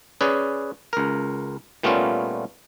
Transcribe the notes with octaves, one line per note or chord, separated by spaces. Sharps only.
C#4 G#4 B4 D5
C#2 A#4
A#2 G3 A3 B3 C#4 F4